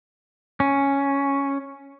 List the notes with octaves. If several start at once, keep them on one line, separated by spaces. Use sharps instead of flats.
C#4